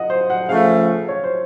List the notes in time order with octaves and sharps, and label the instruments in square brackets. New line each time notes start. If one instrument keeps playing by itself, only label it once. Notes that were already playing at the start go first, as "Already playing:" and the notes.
Already playing: [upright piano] D#5 F#5
C5
F#5
[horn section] C#3 F3 A3 [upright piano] F5
[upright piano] C#5
C5